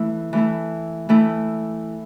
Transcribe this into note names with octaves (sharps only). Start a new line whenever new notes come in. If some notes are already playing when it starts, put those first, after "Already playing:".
Already playing: E3 A3 E4
E3 A3 E4
E3 A3 E4